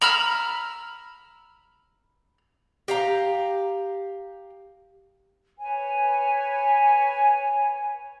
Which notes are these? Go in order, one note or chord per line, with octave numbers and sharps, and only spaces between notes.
A#5 B5 E6 F6
G4 F5 A#5
B4 C#5 G#5